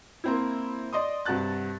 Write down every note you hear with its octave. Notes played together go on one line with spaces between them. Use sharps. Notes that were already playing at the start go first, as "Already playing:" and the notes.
A#3 C4 E4
D5 D#5 C6 D#6
G2 C3 F#4 A5 F#6 A6